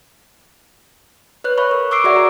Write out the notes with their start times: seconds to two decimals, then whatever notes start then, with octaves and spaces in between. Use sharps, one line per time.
1.44 B4 C#5 F#6
1.58 C#5 E5 B5 C#6
1.71 A#4
1.91 C#6 D6 E6 C7 D7
2.04 F#4 G#4 D5 E5 F#5
2.16 A#5